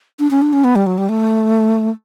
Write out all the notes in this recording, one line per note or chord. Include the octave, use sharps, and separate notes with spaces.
D4
C#4
D4
C#4
B3
G3
F#3
G3
A3